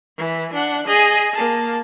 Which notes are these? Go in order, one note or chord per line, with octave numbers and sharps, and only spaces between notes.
E3
D4 F#5
G#4 D#5
A#3 A5